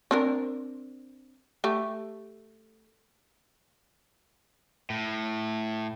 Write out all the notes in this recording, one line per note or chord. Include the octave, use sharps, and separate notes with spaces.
C4 D4 A#4
A3 G4
A2